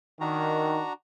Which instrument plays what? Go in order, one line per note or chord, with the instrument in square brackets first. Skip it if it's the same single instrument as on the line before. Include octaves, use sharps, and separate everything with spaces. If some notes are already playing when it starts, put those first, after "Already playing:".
[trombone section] D#3 [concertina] D4 F#4 A#5